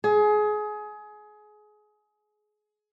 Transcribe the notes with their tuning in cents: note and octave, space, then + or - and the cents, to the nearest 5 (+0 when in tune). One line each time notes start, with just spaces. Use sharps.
G#4 +25